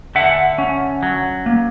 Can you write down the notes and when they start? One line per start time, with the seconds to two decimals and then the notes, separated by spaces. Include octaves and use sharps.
0.15 D3 E5 F#5
0.58 C#4
1.03 F#3
1.46 A#3